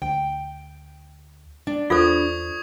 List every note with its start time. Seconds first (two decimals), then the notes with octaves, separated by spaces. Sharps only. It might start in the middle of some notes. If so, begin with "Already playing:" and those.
0.02 D2 G5
1.67 D4
1.90 E2 F4 A4 C5 C#6 D#6 G#6